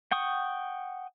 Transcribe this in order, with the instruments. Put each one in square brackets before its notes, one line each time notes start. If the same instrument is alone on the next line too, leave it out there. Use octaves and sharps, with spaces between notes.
[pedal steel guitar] F#5 G5 C#6 D#6